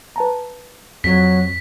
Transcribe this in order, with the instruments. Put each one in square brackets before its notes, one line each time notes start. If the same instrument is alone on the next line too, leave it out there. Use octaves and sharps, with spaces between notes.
[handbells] B4 A5 A#5
[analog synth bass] F2 [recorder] F#3 [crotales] B6